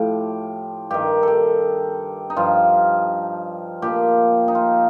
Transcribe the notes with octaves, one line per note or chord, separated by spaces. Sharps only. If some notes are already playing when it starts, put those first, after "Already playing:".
Already playing: A2 F3 G4
G2 D#3 G4
G4 A4
D#4
G2 F3 F4
A#2 F3 G4
D#4
F4